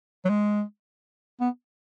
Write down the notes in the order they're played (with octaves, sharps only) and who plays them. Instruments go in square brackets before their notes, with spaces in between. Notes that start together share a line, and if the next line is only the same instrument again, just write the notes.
[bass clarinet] F#3
G#3
B3